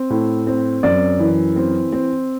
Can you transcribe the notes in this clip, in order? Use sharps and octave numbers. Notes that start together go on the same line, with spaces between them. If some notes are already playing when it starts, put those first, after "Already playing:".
Already playing: C4
A2
C4
F#2 D5
E3
C4
C4